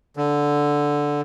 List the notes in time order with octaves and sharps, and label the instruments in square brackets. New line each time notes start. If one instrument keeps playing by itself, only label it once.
[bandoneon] D3